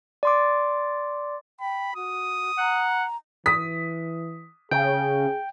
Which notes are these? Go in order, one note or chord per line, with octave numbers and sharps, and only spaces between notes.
D5 C6 D6
G5 B5
F#4 D#6
F#5 A#5
E3 D#6 B6
C#3 G#4 G5